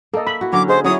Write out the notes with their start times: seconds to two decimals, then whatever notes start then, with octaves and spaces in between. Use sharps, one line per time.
0.14 A#3 A4 D#5
0.27 E5 B5
0.41 E4 F#4
0.53 D3 F#3 C#4 D6
0.68 G#4 C5 D#5
0.84 F#3 C#4 E4 C#5 D#6